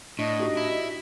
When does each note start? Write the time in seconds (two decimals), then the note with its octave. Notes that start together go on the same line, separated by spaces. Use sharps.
0.19 A2 D4 D#5
0.40 D#4 F#4 G4
0.57 E4